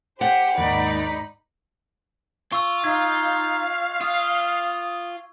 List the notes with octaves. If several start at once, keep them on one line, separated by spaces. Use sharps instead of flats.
G4 C5 F#5
D#2 G#2 D#4 D5 B5
F4 C#6 E6
D#4 F5 G#6
F4 D#6